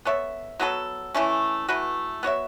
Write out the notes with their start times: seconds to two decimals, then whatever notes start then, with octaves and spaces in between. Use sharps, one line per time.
0.05 B3 A4 C#5 E5
0.60 F#3 B3 F#4 A4
1.14 E3 A3 C#4
1.68 E3 A3 F#4 B4
2.23 B3 F#4 C#5 E5